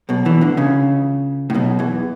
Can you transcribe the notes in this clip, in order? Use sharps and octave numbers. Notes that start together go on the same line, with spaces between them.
B1 B2
E2 E3
D2 D3
C#2 C#3
A2
B1 B2
E2 E3